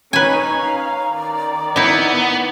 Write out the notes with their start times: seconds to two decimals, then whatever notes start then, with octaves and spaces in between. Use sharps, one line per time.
0.13 C#4 D#4 B4 G#5 A#5
0.59 C#4 F5
1.12 D#3 D5
1.76 B3 D#4 E4